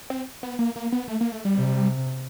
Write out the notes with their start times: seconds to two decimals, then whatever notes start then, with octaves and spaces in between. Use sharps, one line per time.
0.10 C4
0.43 B3
0.59 A#3
0.76 A#3
0.92 B3
1.08 A3
1.21 A#3
1.32 A3
1.45 G3
1.56 C3